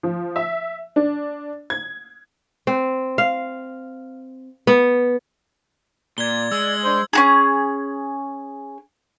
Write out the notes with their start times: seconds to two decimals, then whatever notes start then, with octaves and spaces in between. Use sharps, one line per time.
0.03 F3
0.36 E5
0.96 D4
1.70 G#6
2.67 C4
3.18 F5
4.67 B3
6.18 A#2 D5 G#6 G7
6.52 G#3 E6
6.84 D4 C5
7.13 C#4 F#4 G#4